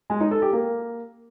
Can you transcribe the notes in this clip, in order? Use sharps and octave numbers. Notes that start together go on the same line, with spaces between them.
G#3
D#4
A4
G4
A#3